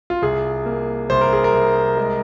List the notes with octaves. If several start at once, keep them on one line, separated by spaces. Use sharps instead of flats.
F4
C2 G#4
A#3
C2 C5
A#4
G#4
A#4
C2
G#3